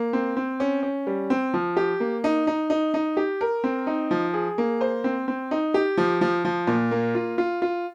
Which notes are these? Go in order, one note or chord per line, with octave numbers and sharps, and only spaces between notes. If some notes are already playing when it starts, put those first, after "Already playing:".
Already playing: A#3
C4
C4
C#4
C#4
G3
C4
F3
G4
A#3
D#4
D#4
D#4
D#4
G4
A#4
C4
D#4
F3
G#4
A#3
C5
C4
C4
D#4
G4
F3
F3
F3
A#2
A#3
F4
F4
F4